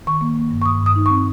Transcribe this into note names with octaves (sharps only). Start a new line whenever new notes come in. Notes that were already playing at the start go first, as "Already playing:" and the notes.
D#3 C#6
A#3
A#3
G2
C#6
G2 D#6
G2
D#6
D#4
C4 C#6